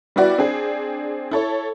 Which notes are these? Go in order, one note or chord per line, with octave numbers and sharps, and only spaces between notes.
G3 B3 E4 F#4 D5
C4 D4 G#4
E4 A4 C#5